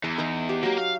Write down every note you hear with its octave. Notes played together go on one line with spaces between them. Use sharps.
E2 E4
D#4 D#5 A#5
G4
F#3 A#3 G4
F5